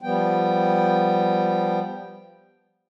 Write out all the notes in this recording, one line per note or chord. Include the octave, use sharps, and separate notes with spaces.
F3 G3 B3 G5